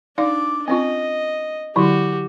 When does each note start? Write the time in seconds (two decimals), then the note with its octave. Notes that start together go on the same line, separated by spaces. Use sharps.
0.18 D4 D#4 D5 F5 D6
0.68 C4 C#4 F4 D#5
1.76 D3 F#3 E4 F#4 G4